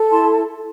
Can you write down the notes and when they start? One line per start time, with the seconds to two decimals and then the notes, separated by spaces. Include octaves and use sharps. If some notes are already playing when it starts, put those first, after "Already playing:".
Already playing: A4
0.10 E4 A5 C6